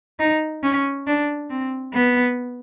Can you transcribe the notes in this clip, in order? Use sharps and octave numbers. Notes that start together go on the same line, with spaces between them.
D#4
C#4
D4
C4
B3